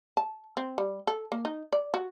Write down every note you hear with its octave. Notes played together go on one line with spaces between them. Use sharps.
A5
C4
G3
A4
A#3
D#4
D5
F#4